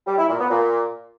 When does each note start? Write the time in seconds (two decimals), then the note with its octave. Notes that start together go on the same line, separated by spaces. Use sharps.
0.07 G3
0.18 E4
0.29 A#2
0.39 B3
0.50 A#2